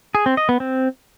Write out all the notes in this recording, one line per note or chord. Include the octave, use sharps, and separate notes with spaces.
G#4
C4
D#5
B3
C4